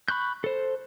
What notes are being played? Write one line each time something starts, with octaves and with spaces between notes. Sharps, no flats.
B5 C#6 F#6 G6
A4 C5